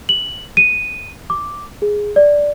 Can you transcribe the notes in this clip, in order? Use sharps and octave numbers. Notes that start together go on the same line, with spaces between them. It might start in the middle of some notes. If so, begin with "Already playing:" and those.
F#7
D#7
D6
G#4
D5